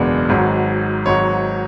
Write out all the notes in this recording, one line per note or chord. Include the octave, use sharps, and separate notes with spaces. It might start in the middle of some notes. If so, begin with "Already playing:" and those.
Already playing: F#1 E2 B2 G#3 D4 B4
G#1 G#2 F#3
G#1 G#2 F#3 C#5